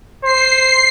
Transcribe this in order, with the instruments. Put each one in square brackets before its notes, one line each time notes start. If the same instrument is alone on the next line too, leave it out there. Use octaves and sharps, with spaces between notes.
[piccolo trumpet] C5 [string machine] C7